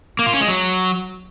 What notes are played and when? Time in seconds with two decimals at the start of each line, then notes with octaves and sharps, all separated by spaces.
0.19 A#3
0.26 F4
0.34 C#4
0.41 G#3
0.48 F#3